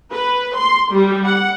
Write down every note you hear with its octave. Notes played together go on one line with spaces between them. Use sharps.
B4
C6
G3
F#5